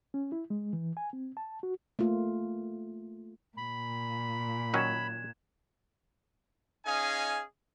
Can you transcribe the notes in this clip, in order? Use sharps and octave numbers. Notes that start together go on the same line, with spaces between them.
C#4
E4
G#3
E3
G#5
C4
A5
F#4
A3 A#3 F4
A#2 B5
D#3 F#3 C#4 F#6 G#6 E7
C#4 D#4 G#4 D#5 F5 G#5